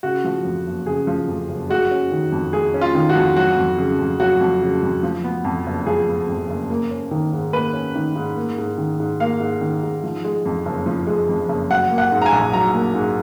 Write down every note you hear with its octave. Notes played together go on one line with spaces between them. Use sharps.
C#3 F#4
F3
F2
F#1
C#3 G#4
F3
F2
F#1
G#3 F#4
C#4
D#3
F2
G#3 G#4
C#4
F4
D#3
F#4
F2
F#3 F#4
F2
C#3
F2
F#3 F#4
F2
C#3
F2
F3
B3
F2
F#1
F3 G#4
B3
F2
F#1
A#3
C#4
D#3
G#2
A#3 B4
C#4
D#3
G#2
A#3
G#2
D#3
G#2
A#3 F5
G#2
D#3
G#2
F3
G#3
F2
F#1
F3
G#3
F2
F#1
F#3 F#5
A#3
F#5
G#2
A#5
G#5
A#1
F#3 A#5
A#3
G#2